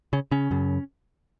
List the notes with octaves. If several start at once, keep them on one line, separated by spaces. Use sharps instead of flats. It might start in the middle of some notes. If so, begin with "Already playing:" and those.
C#3 C#4
C#3 C#4
F#2 C#3